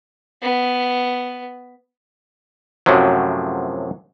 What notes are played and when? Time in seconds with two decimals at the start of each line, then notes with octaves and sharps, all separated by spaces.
0.42 B3
2.86 F#2 A2 C3 F3 F#3